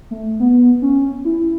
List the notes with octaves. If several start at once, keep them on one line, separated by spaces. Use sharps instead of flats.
A3
B3
C#4
E4